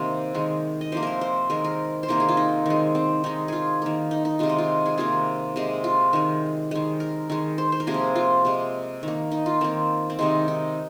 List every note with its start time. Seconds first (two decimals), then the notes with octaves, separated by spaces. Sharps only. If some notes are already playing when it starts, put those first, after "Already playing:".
Already playing: C3 D#3 A#3 C5
0.34 D#3 G#3
0.81 D#5
0.92 C3 F3 A#3 C5
1.03 A#4 C5
1.21 C5
1.50 D#3 G#3 A#4
1.64 A#4
2.03 C5
2.08 C3 D#3 A#3 A#4
2.20 G#4
2.29 F4
2.37 D#4
2.66 D#3 G#3
2.95 C4
3.24 D#3 G#3 D#4
3.48 F4 G#4
3.82 D#3 A#3
4.11 D#4
4.25 D#4
4.39 C3 D#3 G#3 F4
4.49 D#4
4.58 F4
4.86 G#4
4.97 C3 D#3 A#3 F4
5.56 C3 G#3
5.84 F4
6.13 D#3 G#3
6.71 D#3 G#3
7.00 A#4
7.30 D#3 G#3
7.58 C5
7.72 C5
7.80 A#4
7.87 C3 F3 A#3 G#4
7.94 A#4
8.15 F4
8.45 C3 G#3
9.03 D#3 A#3
9.32 D#4
9.46 F4
9.61 D#3 A#3 C4
10.10 C4
10.19 C3 D#3 G#3 D#4
10.48 D#4